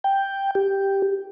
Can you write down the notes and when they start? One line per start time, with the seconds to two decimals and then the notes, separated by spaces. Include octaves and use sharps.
0.04 G5
0.55 G4